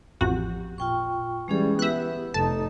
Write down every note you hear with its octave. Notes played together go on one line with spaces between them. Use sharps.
A1 F2 F#4 G4
A#2 F4 G5 C#6
E3 G3 G#3 C#4 G#4
B3 E4 G4 E5 F#6
F1 D#4 A4 A5